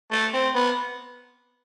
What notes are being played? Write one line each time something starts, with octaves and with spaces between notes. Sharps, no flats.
A3
C4
B3